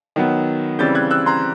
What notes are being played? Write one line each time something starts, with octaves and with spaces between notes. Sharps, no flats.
D#3 F#3 B3
C#3 E3 G3 C4 G6 A6
F#6 G#6
E6 F#6
A#5 C6